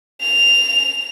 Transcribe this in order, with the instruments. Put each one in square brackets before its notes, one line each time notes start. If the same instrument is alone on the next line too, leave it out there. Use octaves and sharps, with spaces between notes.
[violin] F7